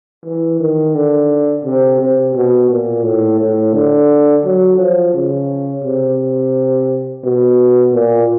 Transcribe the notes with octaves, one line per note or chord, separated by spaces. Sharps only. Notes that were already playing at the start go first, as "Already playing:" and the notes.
E3
D#3
D3
C3
C3
B2
A#2
A2
A2
D3
F#3
F3
C#3
C3
B2
A#2